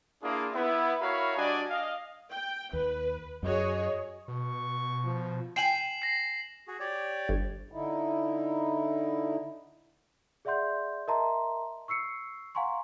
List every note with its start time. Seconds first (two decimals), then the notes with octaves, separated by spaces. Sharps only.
0.23 A#3 D4 E4 F4 G#4
0.54 B3 E4 E5
1.01 E4 F#4 A#4 C#5 F5 B5
1.37 G3 D4 F#4 D5 D#5 G#5
1.70 D#5 F5
2.31 G5
2.73 D#2 B4
3.43 F#2 F#4 G#4 C#5 D#5
4.28 B2 C#6
5.04 F3
5.56 G5 G#5 C7 E7 F#7
6.02 A#6 C7
6.68 F#4 G#4
6.80 G4 C#5 D5
7.29 G1
7.72 D3 D#4 E4
10.45 G#4 D5 E5 F#5 C6 G6
11.08 A#4 D#5 E5 A5 A#5 C6
11.88 C#6 E6 C7 C#7
12.55 F5 F#5 G#5 A#5 C6 C#6